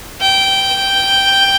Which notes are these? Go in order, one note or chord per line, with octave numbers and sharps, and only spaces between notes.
G5